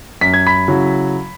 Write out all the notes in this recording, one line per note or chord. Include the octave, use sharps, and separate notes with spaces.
F#2 B6
G#6
B5 B6
C#3 F#3 E4